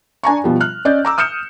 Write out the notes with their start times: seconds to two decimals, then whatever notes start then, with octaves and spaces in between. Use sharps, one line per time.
0.23 D4 G#5 A#5 C#6
0.44 B2 F3 G3
0.60 F6 F#6
0.85 C#4 D5 D#5 G6
1.05 A#5 D6 E6
1.18 D#6 F6 G6 C#7 E7